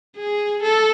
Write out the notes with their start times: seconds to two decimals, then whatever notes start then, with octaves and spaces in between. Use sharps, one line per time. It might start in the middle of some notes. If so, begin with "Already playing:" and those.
0.17 G#4
0.63 A4